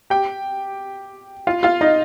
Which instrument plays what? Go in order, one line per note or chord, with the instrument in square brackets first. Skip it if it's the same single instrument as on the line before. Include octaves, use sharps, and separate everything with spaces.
[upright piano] G4 G5
F4 F5
F4 F5
D#4 D#5